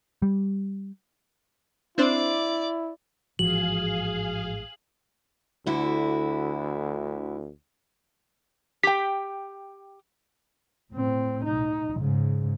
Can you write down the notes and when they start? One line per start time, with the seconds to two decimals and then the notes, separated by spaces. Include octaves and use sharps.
0.22 G3
1.98 C4 D4 E4 C5 D5 D6
3.39 A1 G#2 E3 F3 F#4 G#4 F5 F#7
5.66 D2 D3 E4 F#4
8.83 G4 G5 B6
10.93 A2 C4
11.44 D#4
11.97 G#2 C#3